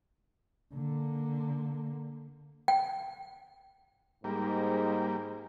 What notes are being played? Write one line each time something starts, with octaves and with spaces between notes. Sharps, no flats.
D3 A#3
G5
G#2 G3 A#3